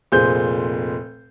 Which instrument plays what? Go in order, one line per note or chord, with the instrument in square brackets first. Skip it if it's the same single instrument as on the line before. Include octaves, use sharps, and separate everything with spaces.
[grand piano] F1 A#2 G#4 C5 G6